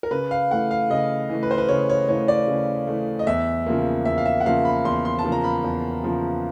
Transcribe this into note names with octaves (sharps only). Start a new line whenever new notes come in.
A#4
C#3 B4
F5
E3 A3 F#5
F5
C#3 D#5
E3 A3
B4
C5
B4
C#3 C#5
C#5
E3 A3 C#5
D5
C#3
E3 A3
D#5
E2 E5
C#3 F3 A#3
E2 E5
F5
E5
F#5
C#3 F3 A#3 F5
B5
E2 C6
C6
A5
C#3 F3 A#3
A#5
B5
E2
C#3 F3 A#3